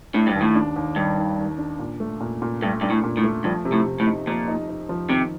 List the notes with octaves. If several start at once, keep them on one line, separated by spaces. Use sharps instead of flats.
A2 D4
G2
D#2
A2
D4
D#2
G2 D#3
D#3
D#3
D4
A#2
A3
A#2
A#2
G2 A3
G2 D4
A2
A#2
A2
A3
G2 F3
C3
A2
C3
A2
D#4
A#2 F3
D#4
D#4
F3
C3 D#3